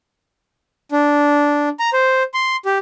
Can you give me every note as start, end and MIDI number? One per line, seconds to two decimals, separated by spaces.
0.92 1.69 62
1.80 1.90 82
1.93 2.23 72
2.34 2.56 84
2.65 2.78 67